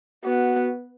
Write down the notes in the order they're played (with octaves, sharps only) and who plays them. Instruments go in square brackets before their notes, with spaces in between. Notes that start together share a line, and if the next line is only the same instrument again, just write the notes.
[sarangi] B3 [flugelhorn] F#4